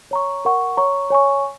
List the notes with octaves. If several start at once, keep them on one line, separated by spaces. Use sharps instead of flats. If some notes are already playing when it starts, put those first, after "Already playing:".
C#5 A#5 C#6
A#4 F#5 C#6
C#5 A#5 C#6
C#5 G#5 C#6